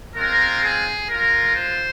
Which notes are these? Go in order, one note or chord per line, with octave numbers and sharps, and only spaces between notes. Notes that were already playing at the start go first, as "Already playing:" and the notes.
G#3 C4 F4 A#4
G#4
G#3 F4 A#4
C5